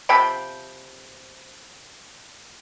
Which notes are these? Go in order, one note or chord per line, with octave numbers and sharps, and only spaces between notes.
C3 F3 G5 B5